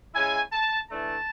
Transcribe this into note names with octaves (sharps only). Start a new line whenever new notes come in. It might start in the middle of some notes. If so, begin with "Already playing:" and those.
C#3 G#3 C#4 E4 G#5
A5
E3 A3 D4 A5